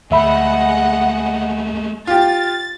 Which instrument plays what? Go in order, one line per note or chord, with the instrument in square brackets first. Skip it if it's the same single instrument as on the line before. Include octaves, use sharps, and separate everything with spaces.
[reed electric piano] D2 E5 B5 [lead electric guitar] G#3 A3 [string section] G#4 D#5 F#5
[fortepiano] F4 G4 [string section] A6